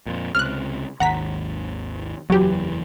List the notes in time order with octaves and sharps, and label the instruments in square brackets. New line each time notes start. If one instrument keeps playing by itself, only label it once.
[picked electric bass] F2 A#2
[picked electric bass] C#2 C3 [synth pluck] F6 F#6
[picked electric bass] G#1 D#2 [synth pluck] F#5 A#5 B6
[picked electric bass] F#1 E2 E3 [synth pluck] F#3 G4